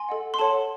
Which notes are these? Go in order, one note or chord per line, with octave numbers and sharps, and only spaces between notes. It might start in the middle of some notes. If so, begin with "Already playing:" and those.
Already playing: G#5 C6
A4 D#5 F#5
C6
A4 C#5 F#5 A5